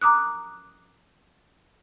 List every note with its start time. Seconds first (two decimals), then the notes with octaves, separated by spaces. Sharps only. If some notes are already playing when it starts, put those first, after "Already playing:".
0.02 A#5 D6 D#6 F#6